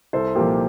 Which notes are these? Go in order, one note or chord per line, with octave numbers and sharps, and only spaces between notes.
C2 A4 C5
A#2 F3 G4 A#4